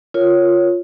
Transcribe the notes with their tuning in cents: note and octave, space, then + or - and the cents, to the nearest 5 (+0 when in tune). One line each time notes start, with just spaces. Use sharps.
F4 +0 A#4 +5 C#5 +0